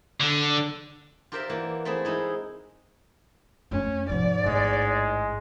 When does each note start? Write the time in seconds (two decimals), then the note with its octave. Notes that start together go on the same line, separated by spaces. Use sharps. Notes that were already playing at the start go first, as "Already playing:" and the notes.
0.21 D3
1.32 F4 G4 A#4 C5 D5 E5
1.49 E3 A#3 F#4
1.85 A3 C4 E4 G#4
2.05 G#3 D#4 E4
3.71 F2 A3 C#4
4.09 G#2 C3 F3 D5
4.44 A1 A2 G#3